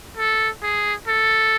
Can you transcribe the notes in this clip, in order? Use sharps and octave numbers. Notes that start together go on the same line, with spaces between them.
A4
G#4
A4